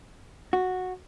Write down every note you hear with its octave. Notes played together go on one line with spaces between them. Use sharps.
F#4